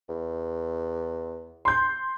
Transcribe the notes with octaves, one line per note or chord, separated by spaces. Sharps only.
E2
C6 G6